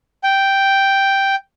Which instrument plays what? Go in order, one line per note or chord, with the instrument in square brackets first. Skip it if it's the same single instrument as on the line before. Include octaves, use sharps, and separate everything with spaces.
[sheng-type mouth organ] G5